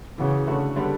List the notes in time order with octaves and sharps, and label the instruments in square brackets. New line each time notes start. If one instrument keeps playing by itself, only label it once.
[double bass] C#3 [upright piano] E3 B3 F#4
[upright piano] D3 A3 D4 F#4
D3 G3 B3 D4